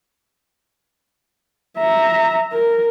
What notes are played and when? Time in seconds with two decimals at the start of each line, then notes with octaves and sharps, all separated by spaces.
1.78 E5 A#5
2.53 A#4